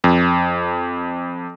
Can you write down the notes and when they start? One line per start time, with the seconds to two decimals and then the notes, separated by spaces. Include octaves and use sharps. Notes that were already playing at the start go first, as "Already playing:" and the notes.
0.04 F2